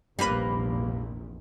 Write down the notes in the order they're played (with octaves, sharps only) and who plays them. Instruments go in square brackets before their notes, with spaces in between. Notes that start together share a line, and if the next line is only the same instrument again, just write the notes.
[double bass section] F1 A#1 E2 [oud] G3 A#3 B4